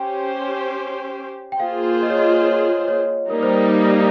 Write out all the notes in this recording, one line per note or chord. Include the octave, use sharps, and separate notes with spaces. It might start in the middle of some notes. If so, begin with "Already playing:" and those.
Already playing: C#4 G4 C5 G5
G5
A#3 F4 G#4 C5 F5
D#5
C#5
D#5
C#5
C#5
G3 A#3 D#4 A#4
C5
A#4